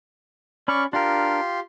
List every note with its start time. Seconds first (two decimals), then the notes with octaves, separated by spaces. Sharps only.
0.68 C#4 D5 B5 C#6 F6
0.93 D4 F4 G4 A#4 C6